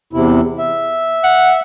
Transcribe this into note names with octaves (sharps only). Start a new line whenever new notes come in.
E2 C3 E4
E5
F#5